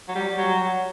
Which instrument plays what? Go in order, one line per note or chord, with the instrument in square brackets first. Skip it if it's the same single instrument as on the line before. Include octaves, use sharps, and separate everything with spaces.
[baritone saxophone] F#3
G3
F#3